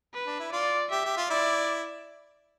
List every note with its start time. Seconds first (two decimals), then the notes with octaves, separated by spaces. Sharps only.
0.14 B4
0.27 D4
0.39 E4
0.52 F4 D5
0.91 G4 E5
1.05 G4
1.17 F4
1.30 E4 D5